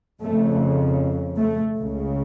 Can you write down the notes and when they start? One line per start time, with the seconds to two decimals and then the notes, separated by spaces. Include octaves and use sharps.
0.22 F2 C#3 A3
1.38 A3
1.76 C#2 C#3